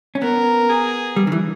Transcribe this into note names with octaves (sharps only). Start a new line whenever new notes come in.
C#4
B3 A#4
G#4
G3
D#3
E3